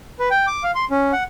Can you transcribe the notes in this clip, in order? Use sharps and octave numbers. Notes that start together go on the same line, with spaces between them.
B4
G5
D6
F5
C6
C#4
F#5